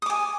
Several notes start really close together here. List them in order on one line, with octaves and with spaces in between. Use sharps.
D#6 D6 G#5